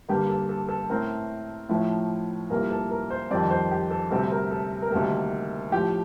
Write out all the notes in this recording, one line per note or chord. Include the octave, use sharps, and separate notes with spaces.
G2 D3 G3 A#3 G4
A4
A4
A4
A2 A3 C4 A#4
A2 F3 A3
C2 A#2 G3 A#3 A#4
A4
A#4
C5
F2 D#3 G3 C4 D5
C5
G4
A4
D2 C3 G3 C4 A4
A#4
A4
A#4
D2 C3 D#3 G3 A#3 A4
A2 F3 A3 G4